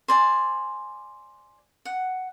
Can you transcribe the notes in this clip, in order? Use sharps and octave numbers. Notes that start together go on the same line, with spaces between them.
C5 D5 G#5
F#5